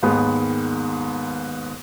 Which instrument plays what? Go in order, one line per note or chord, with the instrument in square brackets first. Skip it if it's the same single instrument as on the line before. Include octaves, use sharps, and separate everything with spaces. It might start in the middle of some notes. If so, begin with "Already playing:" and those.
[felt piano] D#2 G#2 D#3 G#3 B3